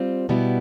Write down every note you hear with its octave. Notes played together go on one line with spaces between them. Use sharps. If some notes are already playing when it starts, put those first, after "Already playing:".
Already playing: G3 C4 F4
B2 G3 B3 E4